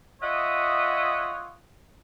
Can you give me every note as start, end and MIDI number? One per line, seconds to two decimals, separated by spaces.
0.22 1.53 65
0.22 1.53 73
0.22 1.53 75
0.22 1.53 76
0.22 1.53 78
0.22 1.53 87